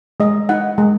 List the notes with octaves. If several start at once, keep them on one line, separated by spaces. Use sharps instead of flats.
G#3 D#5
D#4 F#5
G#3